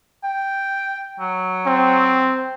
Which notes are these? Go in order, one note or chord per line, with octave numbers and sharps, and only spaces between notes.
G5
F#3
C4